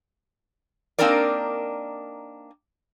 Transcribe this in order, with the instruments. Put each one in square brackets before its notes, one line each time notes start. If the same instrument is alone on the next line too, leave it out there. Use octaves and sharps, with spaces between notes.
[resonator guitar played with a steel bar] A#3 C4 D4 D#4 A#4 D5